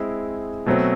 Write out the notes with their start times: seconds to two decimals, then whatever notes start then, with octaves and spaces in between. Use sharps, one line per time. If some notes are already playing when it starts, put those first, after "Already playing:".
Already playing: G#3 C4 E4 G#4
0.66 B2 F#3 A3 C4